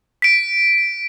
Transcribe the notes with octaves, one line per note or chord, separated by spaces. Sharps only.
B6 D7